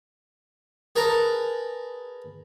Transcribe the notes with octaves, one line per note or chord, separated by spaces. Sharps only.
G#4 A#4 B4 A5 A#5